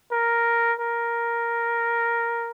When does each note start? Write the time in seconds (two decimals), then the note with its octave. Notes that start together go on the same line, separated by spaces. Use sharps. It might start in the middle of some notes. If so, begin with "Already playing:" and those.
0.12 A#4
0.80 A#4